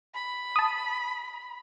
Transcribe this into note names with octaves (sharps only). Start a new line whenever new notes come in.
B5
A5 D#6